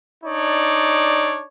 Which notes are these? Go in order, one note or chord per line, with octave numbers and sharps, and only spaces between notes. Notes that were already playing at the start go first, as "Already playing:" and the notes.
D4 D#4 C#5 D5